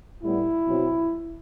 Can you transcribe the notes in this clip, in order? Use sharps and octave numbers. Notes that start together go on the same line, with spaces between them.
A2 G3 B3 E4
B2 F#3 C4